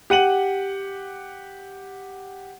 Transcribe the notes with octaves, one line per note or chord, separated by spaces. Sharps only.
G4 F#5 D#7 F#7